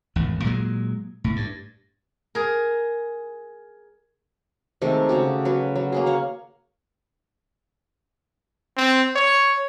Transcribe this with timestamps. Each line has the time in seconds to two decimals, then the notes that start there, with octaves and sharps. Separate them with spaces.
0.16 G#1 E2 A2
0.44 A#2 F#3 G#3
1.24 A2
1.36 G2
2.35 G#4 A#4
4.82 C3 D#3 G#3 A3
5.09 C#3 F#4 G4
5.45 F#3 B4
5.75 F#3
5.92 A#3 C#4 G#4
6.06 C#5 F5 F#5
8.77 C4
9.16 C#5